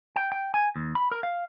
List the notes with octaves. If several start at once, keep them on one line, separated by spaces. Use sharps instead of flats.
G5
G5
G#5
D#2
B5
A#4
F5